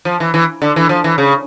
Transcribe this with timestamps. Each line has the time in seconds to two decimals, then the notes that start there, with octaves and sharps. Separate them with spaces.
0.05 F3
0.20 E3
0.34 E3
0.62 D3
0.76 E3
0.89 F3
1.04 E3
1.18 C#3